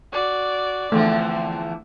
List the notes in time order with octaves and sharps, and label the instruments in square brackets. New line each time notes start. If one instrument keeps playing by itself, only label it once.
[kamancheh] F#4 D5
[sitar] E2 D3 F3 [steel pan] A3 [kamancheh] C4